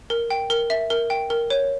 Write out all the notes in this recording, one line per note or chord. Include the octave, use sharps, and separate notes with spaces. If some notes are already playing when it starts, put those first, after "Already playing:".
A#4
G5
A#4
E5
A#4
G5
A#4
C#5